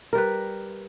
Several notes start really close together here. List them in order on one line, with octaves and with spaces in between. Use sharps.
A#4 G3 B4